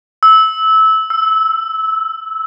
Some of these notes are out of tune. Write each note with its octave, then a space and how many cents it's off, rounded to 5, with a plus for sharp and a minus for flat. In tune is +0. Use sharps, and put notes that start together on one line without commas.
E6 -20
E6 +10